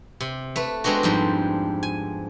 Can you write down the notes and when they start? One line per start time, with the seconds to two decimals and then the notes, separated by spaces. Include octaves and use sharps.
0.20 C3
0.56 A3 B4
0.84 G#3 B3 C4 D4 F#4
1.03 F2 G#2 G3
1.83 G#5